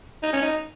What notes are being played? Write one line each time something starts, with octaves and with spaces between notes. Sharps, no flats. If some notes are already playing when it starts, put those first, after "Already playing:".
D#4
C#4
D#4